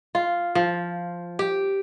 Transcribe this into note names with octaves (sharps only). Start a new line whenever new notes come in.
F4
F3
G4